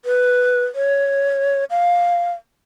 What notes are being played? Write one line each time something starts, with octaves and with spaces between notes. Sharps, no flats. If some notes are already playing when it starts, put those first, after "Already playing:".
B4
C#5
F5